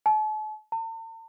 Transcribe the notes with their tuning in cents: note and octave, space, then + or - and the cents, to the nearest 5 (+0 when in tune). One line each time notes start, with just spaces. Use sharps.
A5 -40
A5 +45